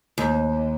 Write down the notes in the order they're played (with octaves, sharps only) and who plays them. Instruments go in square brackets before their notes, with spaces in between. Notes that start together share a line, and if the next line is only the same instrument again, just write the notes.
[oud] D#2